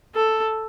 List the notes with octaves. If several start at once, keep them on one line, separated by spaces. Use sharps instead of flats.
A4